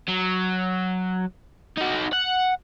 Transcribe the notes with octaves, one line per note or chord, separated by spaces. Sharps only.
F#3
D#4 F#4
F#5